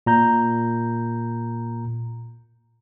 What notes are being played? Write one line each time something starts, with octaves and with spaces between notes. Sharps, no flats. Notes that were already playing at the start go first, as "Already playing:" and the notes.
A#2 A#5 G6